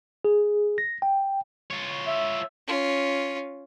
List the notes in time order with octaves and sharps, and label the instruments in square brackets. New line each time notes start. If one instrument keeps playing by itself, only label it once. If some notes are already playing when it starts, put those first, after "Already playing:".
[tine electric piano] G#4
A#6
G5
[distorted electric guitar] F4 C#5
[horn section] E5
[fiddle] C#4 F4